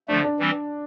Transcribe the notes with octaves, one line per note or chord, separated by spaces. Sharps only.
D3 F3 A3 D4
D4
E3 G3 C4